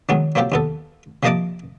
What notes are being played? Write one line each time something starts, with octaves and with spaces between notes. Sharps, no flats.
D#3 F#3 G#3 B3
F#3 A#3 C4 F4 G4
D#2 B3 A4
C3 F3 A#3 D#5 A5 D6